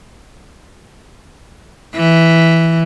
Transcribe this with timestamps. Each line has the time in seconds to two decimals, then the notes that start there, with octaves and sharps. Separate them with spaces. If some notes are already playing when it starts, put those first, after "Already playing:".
1.95 E3